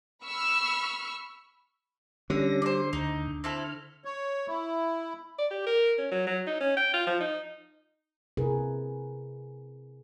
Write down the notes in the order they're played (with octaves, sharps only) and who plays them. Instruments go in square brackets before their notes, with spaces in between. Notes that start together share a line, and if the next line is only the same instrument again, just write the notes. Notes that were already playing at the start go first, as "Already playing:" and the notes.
[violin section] B5 C#6 E6 F6
[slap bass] D3 [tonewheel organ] G3 C#4 A#6
[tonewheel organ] G3 [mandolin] C5 D5
[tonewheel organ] D2 [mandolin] D#4
[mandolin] C4 E4 A4 [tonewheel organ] F6
[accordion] C#5
E4
[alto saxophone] D5
G4
A#4
C#4
F#3
F#3
D#4
C#4
G5
F4
F3
D#4
[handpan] C3 E4 G#4 A#4 B4